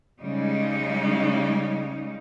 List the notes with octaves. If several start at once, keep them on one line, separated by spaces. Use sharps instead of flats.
C#3 G3 G#3 D#4